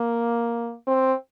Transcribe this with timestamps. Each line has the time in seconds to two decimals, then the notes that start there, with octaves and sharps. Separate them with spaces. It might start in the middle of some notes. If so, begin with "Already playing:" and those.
Already playing: A#3
0.87 C4